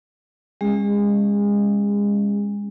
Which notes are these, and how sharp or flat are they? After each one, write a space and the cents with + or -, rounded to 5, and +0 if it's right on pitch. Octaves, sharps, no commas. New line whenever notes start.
G#3 -30 C#4 -10 G#4 -35